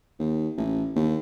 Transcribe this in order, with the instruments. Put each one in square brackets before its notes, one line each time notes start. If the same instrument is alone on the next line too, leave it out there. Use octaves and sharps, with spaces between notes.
[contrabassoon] D#2
A1
D#2